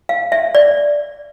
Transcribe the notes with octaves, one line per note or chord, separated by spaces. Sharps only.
F5
E5
D5